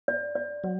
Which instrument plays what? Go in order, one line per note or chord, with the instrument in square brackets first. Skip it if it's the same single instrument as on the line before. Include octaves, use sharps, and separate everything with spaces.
[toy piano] D5
D5
[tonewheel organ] F#3 [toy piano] D5